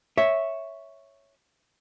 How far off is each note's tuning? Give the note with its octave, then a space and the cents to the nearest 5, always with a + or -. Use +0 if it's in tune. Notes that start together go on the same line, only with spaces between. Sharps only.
C#5 +0 E5 -5